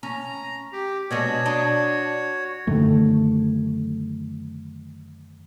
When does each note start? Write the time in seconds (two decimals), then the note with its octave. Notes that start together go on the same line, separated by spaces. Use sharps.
0.03 C#4 A#5
0.73 G4
1.11 B2 G#3 D4 F#4 C#5
1.46 D4 D#5
2.67 F#2 D3 D#3 A3